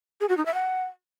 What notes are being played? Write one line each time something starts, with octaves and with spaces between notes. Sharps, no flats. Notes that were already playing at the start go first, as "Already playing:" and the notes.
G#4
F#4
D#4
E5
F#5